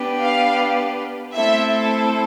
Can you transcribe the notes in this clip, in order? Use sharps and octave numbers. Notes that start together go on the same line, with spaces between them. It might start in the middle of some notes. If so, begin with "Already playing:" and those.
Already playing: B3 D4 G4 B4
F5
A3 C4 E4 A4 C5 E5